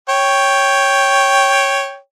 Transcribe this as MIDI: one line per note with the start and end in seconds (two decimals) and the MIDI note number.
0.09 1.97 73
0.09 1.97 79